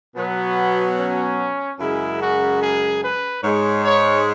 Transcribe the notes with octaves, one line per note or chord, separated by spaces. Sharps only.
B2 F#3 B3
C#4
F#2 C#3 G#3 E4
F#4
G#4
B4
G#2 G#3 C#5
C#5